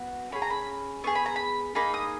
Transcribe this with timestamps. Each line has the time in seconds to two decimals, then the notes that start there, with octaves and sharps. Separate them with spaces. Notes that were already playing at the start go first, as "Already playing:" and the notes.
Already playing: B3 F#4
0.32 C#4 G#4 B5
0.42 A#5
0.50 B5
1.04 B3 F4 G#4 C#6
1.15 B5
1.26 A#5
1.36 B5
1.75 A#3 D#4 G#4 B5
1.94 D#6